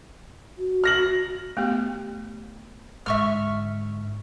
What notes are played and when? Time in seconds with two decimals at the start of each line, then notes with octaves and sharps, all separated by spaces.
0.59 F#4
0.84 F6 A#6 F#7
1.57 A3 B3 G4
3.06 G#2 D3 E5 C#6 F6